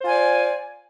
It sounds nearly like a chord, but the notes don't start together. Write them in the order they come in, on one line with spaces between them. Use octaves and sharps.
C5 F4 G#5 D5